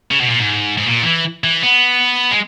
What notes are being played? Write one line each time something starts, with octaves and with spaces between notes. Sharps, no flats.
C#3
B2
A#2
G#2
G#2
A#2
D#3
E3
E3
B3
G#3